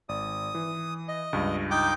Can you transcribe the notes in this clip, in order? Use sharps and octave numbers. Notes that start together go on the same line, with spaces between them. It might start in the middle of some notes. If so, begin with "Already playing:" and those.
G#1 D5 D#6
E3
D#5
C#2 G2
D#4 G5 D6